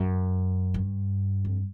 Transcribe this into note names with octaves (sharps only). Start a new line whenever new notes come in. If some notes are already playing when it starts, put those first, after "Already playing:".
Already playing: F#2
G2
F2